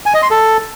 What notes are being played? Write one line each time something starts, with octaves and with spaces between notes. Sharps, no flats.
G#5
D#5
C6
A4